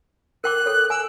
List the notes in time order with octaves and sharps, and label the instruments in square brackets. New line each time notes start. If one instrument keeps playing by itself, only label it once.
[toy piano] A#4 G5 D6 [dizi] F#6
[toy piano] A4 C#5
[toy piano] G#5 [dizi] E6